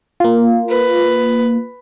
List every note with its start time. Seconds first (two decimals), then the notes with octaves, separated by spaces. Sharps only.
0.20 A#3 F4
0.69 B4